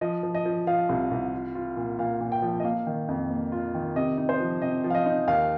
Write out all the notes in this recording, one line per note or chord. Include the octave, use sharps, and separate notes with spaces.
F3 D#5
F3
D#5
F3
F3 F5
C2
C2
F4
F4
A#2
A#2 F5
A#2
G5
F3
D#5
A#3 F5
D#3
F2
A#3
F4
D#3
C3 D#5
D#4
C5
F3
C3 D#5
F3
F5
D#5
D#4
D#2 F5